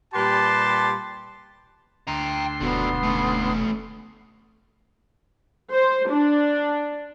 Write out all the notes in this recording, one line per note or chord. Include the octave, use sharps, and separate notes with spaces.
A#2 G3 G4 B4 A5 C6
D2 G5 A#5 C6
E1 D3 F#3 B3
A3 C#4
C5
D4